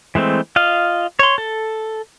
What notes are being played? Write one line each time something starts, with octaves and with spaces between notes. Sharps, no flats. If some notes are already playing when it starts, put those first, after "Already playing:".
E3 G#3 A3 C4
F4 D#5 F5
C#5 C6
A4